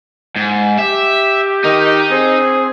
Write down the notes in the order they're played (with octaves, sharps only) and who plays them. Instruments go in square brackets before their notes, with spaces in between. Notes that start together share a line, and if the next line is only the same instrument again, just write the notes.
[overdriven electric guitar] G#2
[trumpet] G4 [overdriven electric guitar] E5
[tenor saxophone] D#3 [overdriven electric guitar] D#4
[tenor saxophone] C4 [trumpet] G#4